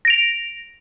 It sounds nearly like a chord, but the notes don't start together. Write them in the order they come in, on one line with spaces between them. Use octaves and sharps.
A#6 D7 F7